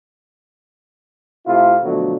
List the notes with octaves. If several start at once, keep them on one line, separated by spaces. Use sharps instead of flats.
C3 A3 E4 F4
B2 D3 F3 F#3 A3